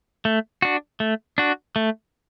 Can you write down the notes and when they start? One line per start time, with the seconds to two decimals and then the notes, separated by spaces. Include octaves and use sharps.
0.25 A3
0.62 D4 F#4
1.00 A3
1.38 D4 F#4
1.76 A3